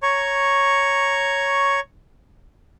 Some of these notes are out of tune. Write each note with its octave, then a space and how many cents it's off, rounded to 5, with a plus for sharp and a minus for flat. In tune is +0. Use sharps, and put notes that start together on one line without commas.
C#5 +0 A#5 +0 C#6 +0